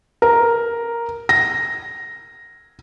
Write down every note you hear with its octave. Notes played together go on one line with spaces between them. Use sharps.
A#4
A#6